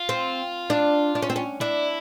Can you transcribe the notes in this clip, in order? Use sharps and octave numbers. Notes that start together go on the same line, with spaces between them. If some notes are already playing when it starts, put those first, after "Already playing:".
Already playing: F4
C4
D4
D4
C#4
C4
C#4
D4 E4